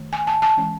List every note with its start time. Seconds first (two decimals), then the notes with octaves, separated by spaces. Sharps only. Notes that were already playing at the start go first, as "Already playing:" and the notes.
Already playing: D#3 A3
0.13 G#5
0.27 A5
0.42 A5
0.57 E3 G#3 C#4